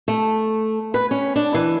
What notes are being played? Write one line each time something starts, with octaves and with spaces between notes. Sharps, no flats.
A3
B4
C#4
D4
E3